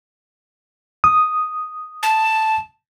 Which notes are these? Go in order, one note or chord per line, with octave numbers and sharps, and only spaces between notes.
D#6
A5